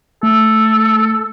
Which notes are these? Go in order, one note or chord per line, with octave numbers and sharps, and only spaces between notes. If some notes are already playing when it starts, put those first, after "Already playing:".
A3 A4